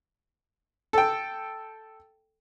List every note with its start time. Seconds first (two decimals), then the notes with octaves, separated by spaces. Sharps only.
0.93 A4 G5